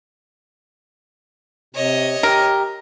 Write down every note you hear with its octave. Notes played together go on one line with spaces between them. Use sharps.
C3 C#5 D#5
G4 A#4